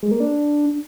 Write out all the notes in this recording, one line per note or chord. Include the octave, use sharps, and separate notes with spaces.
G#3
A#3
D4